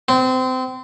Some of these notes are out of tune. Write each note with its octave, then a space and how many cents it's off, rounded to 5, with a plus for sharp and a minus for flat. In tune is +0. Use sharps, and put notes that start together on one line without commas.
C4 -25